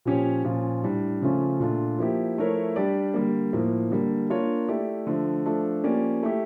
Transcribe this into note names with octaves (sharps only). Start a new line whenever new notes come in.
A#2 F3 C#4 G4 C#5
A#2 F3 C#4 F4
A2 G3 D4
C#3 F3 A3 C#4 F4
A#2 A3 D4 F4
F3 A#3 E4 G4
F3 A3 E4 A#4 C#5
G3 D4 G4 D5
D3 G3 A#3
A2 F3 A#3
D3 G3 A#3
A#3 D4 F4 A#4 C#5
A3 E4 G4 D5
D3 F3 A3
F3 A3 D4 A4
F3 A#3 C#4 G4 D5
A3 E4 G4